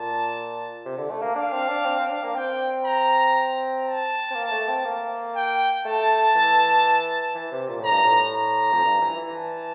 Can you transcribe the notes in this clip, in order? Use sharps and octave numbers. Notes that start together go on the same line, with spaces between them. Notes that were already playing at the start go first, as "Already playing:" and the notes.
Already playing: A#2 A5
C3
D3
A3
A#3
D4 F5
C4
D4
C4
C4
D4
A#3
C4 G5
A#5
A5
C4
A#3
A3
C4
A#3
G5
A3 A5
E3
E3
C3
A#2
A2 A#5
G2
A2
A#5
F2
G2
E3
E3
A5